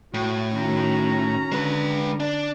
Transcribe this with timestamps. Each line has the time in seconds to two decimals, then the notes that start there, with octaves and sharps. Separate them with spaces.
0.14 A2 F#4
0.55 D#3 C#4 F#4 A#5
1.52 D3 G#3 B4
2.20 D4